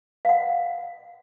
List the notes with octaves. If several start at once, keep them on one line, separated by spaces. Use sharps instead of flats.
F5 F#5